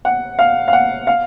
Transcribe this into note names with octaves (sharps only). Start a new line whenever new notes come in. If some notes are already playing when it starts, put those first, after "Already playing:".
F#5
F5
F5
F#5
F5